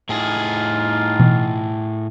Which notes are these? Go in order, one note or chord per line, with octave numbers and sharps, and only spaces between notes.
A2 D#4 F4 G#4
B2 E3